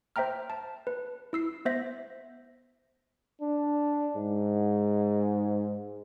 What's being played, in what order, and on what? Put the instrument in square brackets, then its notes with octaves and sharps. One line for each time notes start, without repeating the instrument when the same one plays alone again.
[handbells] C5 E5 G5 A#5 F6
A5
B4
E4 E6 C7
B3 C5 E5 A#6
[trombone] D4
G#2